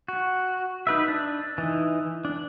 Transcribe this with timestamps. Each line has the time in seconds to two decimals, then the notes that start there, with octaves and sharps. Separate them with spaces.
0.08 F#4
0.87 D#4 B4 E5
1.08 D4
1.58 E3 D#4
2.25 D4